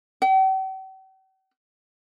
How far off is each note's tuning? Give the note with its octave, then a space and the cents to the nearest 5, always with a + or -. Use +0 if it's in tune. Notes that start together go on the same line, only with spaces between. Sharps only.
G5 -45